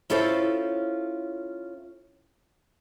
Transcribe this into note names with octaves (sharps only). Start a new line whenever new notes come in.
C#4 E4 F4 A4 C5 C#5